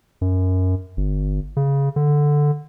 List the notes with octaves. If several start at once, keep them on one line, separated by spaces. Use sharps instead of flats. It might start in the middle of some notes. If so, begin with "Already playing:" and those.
F#2
G1
C#3
D3